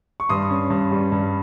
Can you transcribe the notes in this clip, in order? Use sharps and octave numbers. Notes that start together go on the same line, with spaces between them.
C#6
G2 C6 D#6
C#4
G2
G3
G2